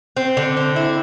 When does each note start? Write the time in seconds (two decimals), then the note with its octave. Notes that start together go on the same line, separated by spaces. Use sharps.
0.16 C4
0.37 D3
0.57 C4
0.76 E4